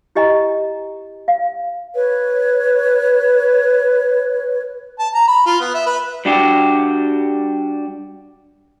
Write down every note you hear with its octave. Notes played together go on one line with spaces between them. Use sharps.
E4 G4 D#5 G#5 A#5
F5
B4 C#5
A5
A#5
B5
F4
B3
E5
B4
G3 D4 F#4 G4